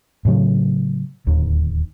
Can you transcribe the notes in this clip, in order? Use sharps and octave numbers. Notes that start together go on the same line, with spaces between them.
A2 C#3 F#3
D1 D#2 D#3